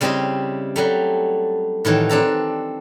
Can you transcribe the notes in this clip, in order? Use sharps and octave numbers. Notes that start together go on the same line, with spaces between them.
C#3 G3 C4 E4 D#5
F#3 G3 A3
A2 D#3 E3 F#3
C4 D4 A4 A#5